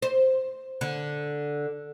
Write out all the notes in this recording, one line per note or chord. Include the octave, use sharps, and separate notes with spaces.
C5
D3